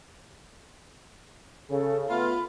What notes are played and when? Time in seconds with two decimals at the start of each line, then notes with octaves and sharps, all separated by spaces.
1.70 C#3 A4
2.09 A3 B3 F4 B5